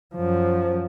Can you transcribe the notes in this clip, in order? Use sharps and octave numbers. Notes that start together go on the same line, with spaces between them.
F#2 F3